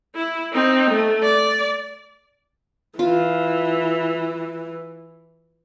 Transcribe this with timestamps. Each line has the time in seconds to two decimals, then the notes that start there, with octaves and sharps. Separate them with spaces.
0.16 E4
0.52 C4 D#4
0.90 A3
1.23 D5
2.99 E3 F4